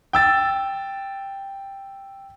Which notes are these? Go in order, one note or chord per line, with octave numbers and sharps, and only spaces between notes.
G5 E6 A6